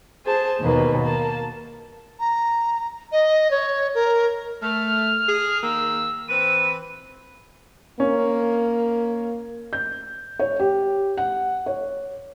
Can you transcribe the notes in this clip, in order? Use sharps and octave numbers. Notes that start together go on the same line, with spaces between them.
G#4 C5 A5
D#2 B2 A#3 B4
A#3 A5
A#5
D#5
C#5
A#4
A3 F6
G#4
D#3 A#3 E6
E3 C4 B4 D#7
A#3 C#4
G6
C#5
G4
F#5
C#5